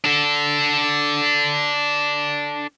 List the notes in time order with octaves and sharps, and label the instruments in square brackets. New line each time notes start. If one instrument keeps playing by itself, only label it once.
[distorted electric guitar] D4 A4